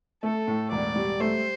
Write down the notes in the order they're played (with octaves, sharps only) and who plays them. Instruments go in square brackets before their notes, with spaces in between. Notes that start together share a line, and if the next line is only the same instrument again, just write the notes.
[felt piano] A3 [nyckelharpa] A4
[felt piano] A2
[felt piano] E1 [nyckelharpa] D5
[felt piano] G3
[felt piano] A3 [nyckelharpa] C5